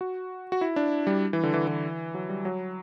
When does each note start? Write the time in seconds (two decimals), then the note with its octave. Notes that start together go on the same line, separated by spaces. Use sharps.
0.01 F#4
0.52 F#4
0.61 E4
0.76 D4
1.07 G3
1.33 E3
1.43 D3
1.54 E3
1.68 E3
2.14 F#3
2.29 G3
2.45 F#3